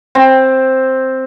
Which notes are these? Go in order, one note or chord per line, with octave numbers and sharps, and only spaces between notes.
C4